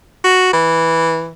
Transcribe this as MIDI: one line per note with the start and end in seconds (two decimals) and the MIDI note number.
0.24 0.50 66
0.53 1.32 52